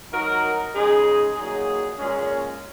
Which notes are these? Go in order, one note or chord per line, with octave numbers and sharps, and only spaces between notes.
F#3 D#4 F#4 A#4
C#3 G#3 D#4 G#4
A#2 F#3 D#4 G#4
A#2 G#3 C#4